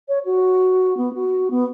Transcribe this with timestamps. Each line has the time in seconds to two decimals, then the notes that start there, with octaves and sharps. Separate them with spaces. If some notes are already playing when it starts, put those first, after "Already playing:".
0.08 C#5
0.25 F#4
0.97 B3
1.13 F#4
1.50 B3